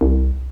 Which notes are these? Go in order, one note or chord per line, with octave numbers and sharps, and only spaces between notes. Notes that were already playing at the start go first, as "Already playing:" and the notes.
C2